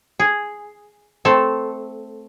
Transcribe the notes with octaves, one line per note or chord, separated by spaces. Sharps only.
G#4
A3 C4 A4